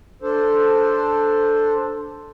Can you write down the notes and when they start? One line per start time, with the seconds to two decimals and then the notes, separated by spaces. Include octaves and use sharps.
0.22 D4 A4 C5